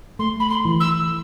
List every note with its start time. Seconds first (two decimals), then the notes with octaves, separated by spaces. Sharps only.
0.19 A3 C6
0.40 B5
0.49 C6
0.65 E3
0.80 E6